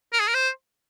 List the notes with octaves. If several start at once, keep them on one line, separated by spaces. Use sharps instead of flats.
A#4
G#4
A#4
C5